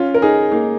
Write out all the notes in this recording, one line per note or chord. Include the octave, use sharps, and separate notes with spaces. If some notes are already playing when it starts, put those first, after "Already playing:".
Already playing: C#4 F4
A#4
D#4 G#4
A#3 D#4